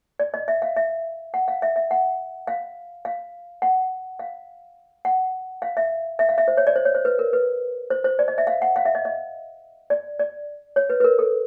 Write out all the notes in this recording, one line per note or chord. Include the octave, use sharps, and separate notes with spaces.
D5
D#5
E5
F5
E5
F#5
F5
E5
E5
F#5
F5
F5
F#5
F5
F#5
F5
E5
E5
F5
E5
C5
C#5
D5
C5
C#5
C5
B4
A#4
B4
C5
C5
D5
D#5
E5
F5
F#5
F5
E5
D#5
D#5
D5
D5
C#5
B4
B4
A#4
A4